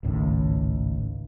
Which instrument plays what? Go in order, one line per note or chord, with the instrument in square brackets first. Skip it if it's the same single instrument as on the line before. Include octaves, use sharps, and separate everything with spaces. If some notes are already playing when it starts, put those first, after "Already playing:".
[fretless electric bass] G#1 C#2 A2 D#3